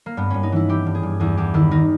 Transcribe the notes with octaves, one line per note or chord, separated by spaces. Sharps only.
A#3
G2 B3
G2 C#4
D#4
E3 E4
E3 G4
G2
G#4
G2
E2 G#4
E2 G4
D#3 E4
D#3 D#4